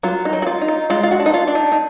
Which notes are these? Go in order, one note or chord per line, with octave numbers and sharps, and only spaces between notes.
F#3 F4
D#4
F#3
F#4
F4
D#4
F4
G#3 F4
F4
F#4
D4
D#4
F4
D4
D#4
D#4